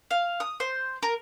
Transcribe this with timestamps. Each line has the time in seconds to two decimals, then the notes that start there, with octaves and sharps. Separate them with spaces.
0.11 F5
0.40 D#6
0.60 C5
1.03 A#4